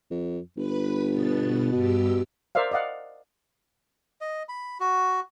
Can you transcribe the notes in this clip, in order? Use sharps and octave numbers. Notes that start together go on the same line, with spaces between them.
F2
G1 B4 B5
B2 B3 A6
G2 B2 G4 E6
A#4 C5 D5 E5 F5
D5 D#5 F5 F#5
D#5
B5
F#4